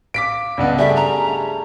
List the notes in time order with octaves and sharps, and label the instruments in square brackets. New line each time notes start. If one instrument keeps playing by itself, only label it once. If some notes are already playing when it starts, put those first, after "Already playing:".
[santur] F5 [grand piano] D6 B6 D7
[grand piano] C#2 G2 B3 [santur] D4
[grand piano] G3 [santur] A3 G#4 [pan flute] E5
[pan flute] A#5